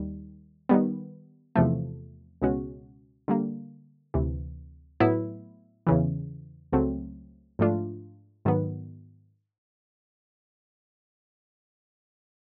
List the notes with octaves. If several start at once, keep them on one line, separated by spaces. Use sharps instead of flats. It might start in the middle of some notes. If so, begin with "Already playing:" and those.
Already playing: D#2 D#3 G3
D#3 G3 B3
E2 C3 F3 A3
C#2 B2 G#3 C#4 F#4
D3 G3 A#3
D2 C3 E3
A2 F#3 B3 E4
E2 C#3 E3
C#2 C#3 F#3 A3 C4
G#2 F3 A3 D4 F4
G#2 D#3 F#3 B3